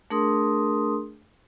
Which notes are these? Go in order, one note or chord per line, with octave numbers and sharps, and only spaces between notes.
A3 D4 G#4 A#4 C6 D#6